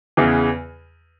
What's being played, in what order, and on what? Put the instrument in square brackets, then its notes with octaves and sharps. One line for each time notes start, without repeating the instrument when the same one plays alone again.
[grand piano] E2 C#3 E3